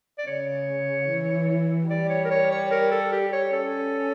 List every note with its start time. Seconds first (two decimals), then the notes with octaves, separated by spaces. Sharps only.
0.19 D5
0.27 C#3 C#5
1.09 E3
1.89 G3 D5
2.10 C#5
2.25 A#4
2.31 C#5
2.51 C#5
2.71 A#4
2.92 A4
3.12 G4
3.33 C#5
3.53 C#4 A4